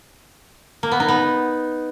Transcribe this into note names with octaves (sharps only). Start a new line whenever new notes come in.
A#3
B3
D#4
B3